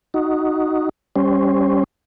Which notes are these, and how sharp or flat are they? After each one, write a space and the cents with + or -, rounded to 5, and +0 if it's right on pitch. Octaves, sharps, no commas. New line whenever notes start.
D#4 +0 F#4 +0
G3 +0 C#4 +5 C5 +0